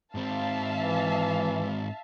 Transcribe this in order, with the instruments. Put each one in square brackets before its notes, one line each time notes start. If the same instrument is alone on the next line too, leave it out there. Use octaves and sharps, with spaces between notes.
[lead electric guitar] G#2 C4 [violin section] E5 F5 A5
[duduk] E3